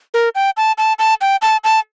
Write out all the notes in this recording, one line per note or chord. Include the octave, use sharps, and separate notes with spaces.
A#4
G5
A5
A5
A5
G5
A5
A5